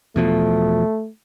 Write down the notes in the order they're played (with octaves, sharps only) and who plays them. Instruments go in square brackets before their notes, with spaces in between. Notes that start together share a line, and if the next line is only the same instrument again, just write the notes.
[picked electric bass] E2 B2 F3 [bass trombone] A3